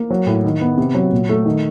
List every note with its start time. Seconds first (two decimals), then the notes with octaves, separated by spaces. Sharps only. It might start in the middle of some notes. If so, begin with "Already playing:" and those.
Already playing: A#3
0.10 F#3
0.27 A2
0.45 D#3
0.61 B3
0.77 C3
0.95 F#3
1.12 A#2
1.29 A3
1.45 D#3